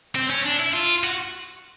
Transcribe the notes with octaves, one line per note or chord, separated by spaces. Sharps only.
C4
C#4
D4
E4
F4
F#4